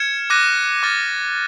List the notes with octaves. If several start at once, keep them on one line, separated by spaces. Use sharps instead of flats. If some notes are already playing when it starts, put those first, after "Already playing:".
Already playing: F6 G#6 C#7 E7
D6 F#6 A#6 D#7
D6 F6 A6